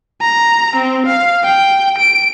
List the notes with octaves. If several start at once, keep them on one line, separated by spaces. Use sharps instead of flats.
A#5
C4
F5
G5
D7